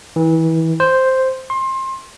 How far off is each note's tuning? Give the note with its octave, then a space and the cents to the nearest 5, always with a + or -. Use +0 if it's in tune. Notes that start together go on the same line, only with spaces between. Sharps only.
E3 -25
C5 +0
C6 +25